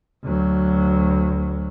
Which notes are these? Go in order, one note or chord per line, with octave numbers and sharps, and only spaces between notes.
D2 F#3